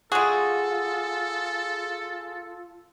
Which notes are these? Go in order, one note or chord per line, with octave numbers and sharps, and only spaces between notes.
G#3 F4 F#4 G#4 A4